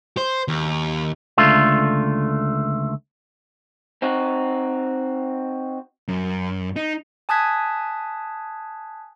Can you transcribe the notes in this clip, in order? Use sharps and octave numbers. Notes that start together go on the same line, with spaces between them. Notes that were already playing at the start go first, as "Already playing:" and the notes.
C5
D#2
C#2 D3 A3 F4
C4 D#4 F#4
F#2
D#4
G#5 A5 D#6 F#6 G#6 B6